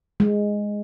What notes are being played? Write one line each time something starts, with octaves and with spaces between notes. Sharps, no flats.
G#3